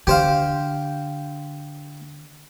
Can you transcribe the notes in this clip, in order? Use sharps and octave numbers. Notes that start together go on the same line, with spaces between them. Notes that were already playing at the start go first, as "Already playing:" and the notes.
D3 G4 C5 F5